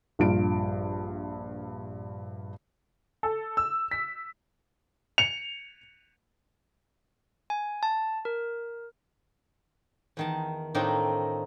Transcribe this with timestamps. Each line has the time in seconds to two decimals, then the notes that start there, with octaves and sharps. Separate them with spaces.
0.19 A#1 G2 F4 D7
3.23 A4
3.57 E6
3.91 B6
5.18 C#7 F7
7.50 G#5
7.83 A5
8.25 A#4
10.17 E2 D#3 A5
10.75 A2 D#3 A#3 C4 D4 D#4